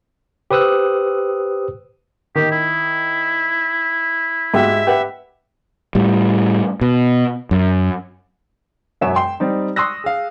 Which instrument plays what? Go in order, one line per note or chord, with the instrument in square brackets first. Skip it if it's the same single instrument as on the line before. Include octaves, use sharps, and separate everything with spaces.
[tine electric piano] G4 B4 C5 D#6 E6 F#6
[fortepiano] D#3 [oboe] G4
[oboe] E4
[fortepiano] G#2 F#4 G4 [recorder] E5
[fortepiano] G4 B4 F#5
[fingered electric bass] A2 G3
B2
F#2
[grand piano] E1 F#2 C#5 E5 F#5 E7
G5 C6
G3 C4 D#4
C6 C#6 D#6 E6 F#6 A#6
G#4 F5